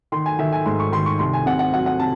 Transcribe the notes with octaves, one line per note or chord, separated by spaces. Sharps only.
D#3 C6
G#5
D#3 E5
G#5
G#2 C6
C#6
D#3 C6
C#6
C2 C6
G#5
C3 F#5
F#5
F#3 F#5
F#5
C3 A5